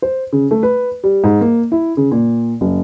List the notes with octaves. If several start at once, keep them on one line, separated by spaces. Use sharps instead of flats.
C5
C#3
A3
B4
G3
G#2
A#3
E4
C#3
A#2
F#1